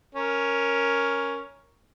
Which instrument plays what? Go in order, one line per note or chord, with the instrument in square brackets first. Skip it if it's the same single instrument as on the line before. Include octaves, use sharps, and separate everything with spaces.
[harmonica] C#4 A#4